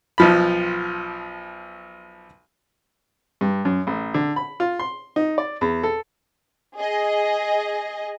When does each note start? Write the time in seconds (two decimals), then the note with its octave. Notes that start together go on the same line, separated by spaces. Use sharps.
0.18 B1 F3 B5
3.41 G2
3.65 F#2
3.87 A1
4.14 D3
4.36 B5
4.60 F4
4.79 C6
5.16 D#4
5.38 D5
5.61 E2
5.83 A4
6.77 G#4 D#5